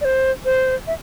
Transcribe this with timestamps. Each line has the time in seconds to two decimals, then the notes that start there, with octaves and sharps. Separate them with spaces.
0.01 D5
0.05 C5
0.45 C5
0.87 E5